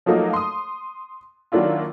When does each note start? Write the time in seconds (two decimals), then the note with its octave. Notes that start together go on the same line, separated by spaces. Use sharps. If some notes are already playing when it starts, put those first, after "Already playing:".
0.06 F3 F#3 A3 A#3 D#4
0.33 C6 D#6
1.52 D#3 F#3 A#3 D4 E4 F4